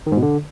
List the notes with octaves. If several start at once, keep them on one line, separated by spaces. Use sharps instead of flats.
D#3
G#2
B2
D3